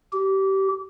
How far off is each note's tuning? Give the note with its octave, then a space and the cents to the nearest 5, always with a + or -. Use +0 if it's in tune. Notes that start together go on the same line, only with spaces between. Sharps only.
G4 -25